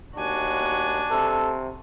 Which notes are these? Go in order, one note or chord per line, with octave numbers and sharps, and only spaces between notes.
D#2 D4 F#4 G#5
C3 A4